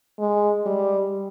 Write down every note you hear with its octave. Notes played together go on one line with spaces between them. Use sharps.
G#3
G3